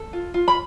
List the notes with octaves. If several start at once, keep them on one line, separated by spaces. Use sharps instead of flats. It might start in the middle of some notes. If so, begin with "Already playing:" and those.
Already playing: A4
F4
F4
B5